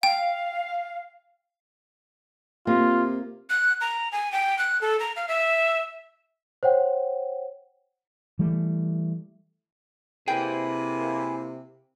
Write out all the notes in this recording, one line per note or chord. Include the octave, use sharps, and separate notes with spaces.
F5 G5
C3 A#3 F4
F#6
A#5
G#5
G5
F#6
A4
A#5
F5
E5
C5 C#5 F#5 G5
E3 G3 A3
C3 A#3 E4 G#4 B4 G5